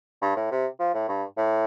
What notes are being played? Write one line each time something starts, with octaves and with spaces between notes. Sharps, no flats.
G2
A2
C3
F3
A2
G2
A2